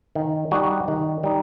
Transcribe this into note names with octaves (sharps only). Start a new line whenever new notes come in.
D#3
G3 D#4 F#4
D#3
G3 D#4